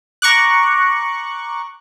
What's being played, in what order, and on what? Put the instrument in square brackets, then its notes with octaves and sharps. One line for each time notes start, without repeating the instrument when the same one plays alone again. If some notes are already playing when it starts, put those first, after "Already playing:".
[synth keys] A#5 C#6 D6 F#6